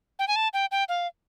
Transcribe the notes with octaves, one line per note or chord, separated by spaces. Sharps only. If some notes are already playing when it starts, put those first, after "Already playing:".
G5
G#5
A5
G5
G5
F5